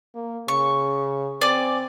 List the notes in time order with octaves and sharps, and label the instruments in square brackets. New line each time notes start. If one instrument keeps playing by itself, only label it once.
[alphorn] A#3
[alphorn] C#3 [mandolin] C#6
[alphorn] C4 [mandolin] D5 G#5 D6